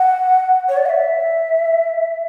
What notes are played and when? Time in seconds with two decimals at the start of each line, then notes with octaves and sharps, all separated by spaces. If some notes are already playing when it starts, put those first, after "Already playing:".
Already playing: F#5
0.69 C#5
0.77 D5
0.86 F#5
0.89 E5